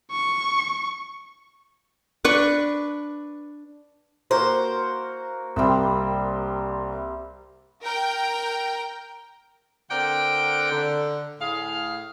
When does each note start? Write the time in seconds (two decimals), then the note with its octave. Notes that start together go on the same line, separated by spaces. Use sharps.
0.11 C#6
2.25 D4 B4 C#6
4.31 A#3 F#4 A#4 C5
5.56 C2 G3 C4 E6
7.84 A#4 G5
9.90 D3 C4 A#4 D5 F#5 G5
10.72 D3
11.41 A2 G#4 F5